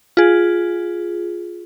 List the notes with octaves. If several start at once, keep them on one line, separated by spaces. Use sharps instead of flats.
F4 G#4